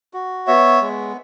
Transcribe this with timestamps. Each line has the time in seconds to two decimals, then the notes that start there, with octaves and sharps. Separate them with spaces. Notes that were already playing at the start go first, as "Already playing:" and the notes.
0.14 F#4
0.47 B3 C#5 E5
0.81 G#3